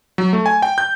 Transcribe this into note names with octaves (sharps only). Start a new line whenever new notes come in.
F#3
A3
G#5
G5
G6